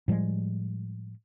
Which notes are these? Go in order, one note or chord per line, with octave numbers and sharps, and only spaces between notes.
A2 F3 G3 G#3